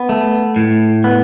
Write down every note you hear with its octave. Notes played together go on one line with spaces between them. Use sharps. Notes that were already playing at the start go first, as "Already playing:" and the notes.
Already playing: B3
A3
A2
B3